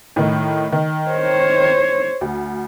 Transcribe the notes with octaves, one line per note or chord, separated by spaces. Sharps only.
A2 D#3
D#3
C5 C#5
D2